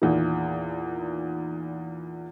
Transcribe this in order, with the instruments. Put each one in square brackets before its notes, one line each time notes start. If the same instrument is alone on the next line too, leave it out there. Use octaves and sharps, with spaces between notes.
[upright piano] E2 A#2 D#3